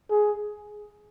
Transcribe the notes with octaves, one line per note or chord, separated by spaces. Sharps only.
G#4